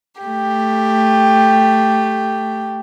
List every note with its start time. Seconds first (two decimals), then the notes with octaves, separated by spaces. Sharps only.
0.21 A3 G4